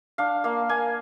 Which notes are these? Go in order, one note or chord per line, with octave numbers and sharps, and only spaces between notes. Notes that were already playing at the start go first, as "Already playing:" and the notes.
D4 F5
A#3 F5
A#3 G#5